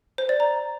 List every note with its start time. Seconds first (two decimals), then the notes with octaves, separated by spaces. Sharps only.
0.18 C5
0.29 D5
0.40 A#5